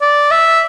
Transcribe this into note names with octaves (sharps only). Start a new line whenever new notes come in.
D5
E5